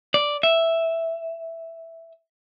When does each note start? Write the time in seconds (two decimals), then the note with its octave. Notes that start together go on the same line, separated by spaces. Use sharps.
0.14 D5
0.43 E5